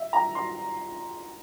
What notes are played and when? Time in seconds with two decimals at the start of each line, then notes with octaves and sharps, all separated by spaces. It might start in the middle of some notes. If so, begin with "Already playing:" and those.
Already playing: E5
0.13 A#5
0.35 C6